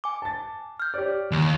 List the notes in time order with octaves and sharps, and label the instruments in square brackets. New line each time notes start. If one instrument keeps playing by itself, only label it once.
[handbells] G#5 D6
[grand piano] A5 A6
[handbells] F6 G6
[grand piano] G4 C#5 D5
[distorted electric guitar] D#2